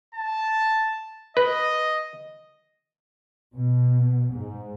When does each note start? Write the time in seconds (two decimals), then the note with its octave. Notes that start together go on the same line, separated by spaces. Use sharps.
0.15 A5
1.37 B4 D#5
3.54 B2
4.33 G#2